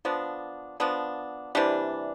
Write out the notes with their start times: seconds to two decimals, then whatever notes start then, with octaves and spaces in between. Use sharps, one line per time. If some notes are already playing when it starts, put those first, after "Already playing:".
0.05 F3 B3 D4
0.80 F3 B3 D4
1.55 C3 E3 G3 D4